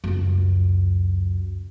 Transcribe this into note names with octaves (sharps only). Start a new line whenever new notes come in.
C#2 F#2